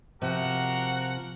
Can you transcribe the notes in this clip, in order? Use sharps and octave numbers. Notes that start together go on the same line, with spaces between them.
C3 F3 F#4 A#4 F#5